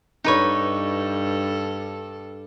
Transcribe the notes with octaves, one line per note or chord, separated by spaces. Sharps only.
G2 D#4 A4 B4 C#5